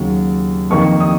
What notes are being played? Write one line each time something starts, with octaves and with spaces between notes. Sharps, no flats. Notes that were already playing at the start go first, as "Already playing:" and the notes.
Already playing: D#2 C#3 F#3
F2 D#3 A#3 C#6
D#6